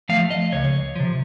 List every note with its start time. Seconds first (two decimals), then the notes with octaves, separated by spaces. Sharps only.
0.09 F3 A3 F5
0.31 D#5
0.52 C#2 C#5
0.96 C3 F3